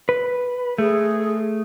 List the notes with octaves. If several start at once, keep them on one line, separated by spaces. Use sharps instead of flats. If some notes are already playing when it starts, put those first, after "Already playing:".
B4
A3 G#4